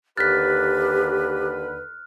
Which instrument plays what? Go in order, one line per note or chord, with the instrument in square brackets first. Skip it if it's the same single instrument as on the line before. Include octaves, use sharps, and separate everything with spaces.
[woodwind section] D#2 D3 B4 [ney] G4 [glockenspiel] F6 F#6 [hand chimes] A6 B6